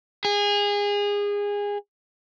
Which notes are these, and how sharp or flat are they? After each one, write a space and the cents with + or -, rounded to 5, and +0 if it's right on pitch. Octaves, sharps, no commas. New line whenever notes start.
G#4 -25